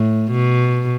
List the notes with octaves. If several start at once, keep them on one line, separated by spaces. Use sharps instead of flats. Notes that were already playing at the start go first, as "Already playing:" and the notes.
Already playing: A2
B2